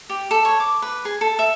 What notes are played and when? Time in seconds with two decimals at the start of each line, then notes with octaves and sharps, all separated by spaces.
0.10 G4
0.31 A4
0.45 C#5
0.60 D6
0.82 B4
1.05 G#4
1.21 A4
1.39 E5